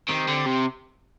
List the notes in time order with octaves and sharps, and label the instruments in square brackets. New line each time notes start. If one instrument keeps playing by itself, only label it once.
[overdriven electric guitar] D#3 [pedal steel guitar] C4 G4 C5
[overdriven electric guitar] D3
C3